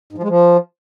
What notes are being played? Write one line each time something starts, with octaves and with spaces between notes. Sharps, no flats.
G#2
F3
G#3
F3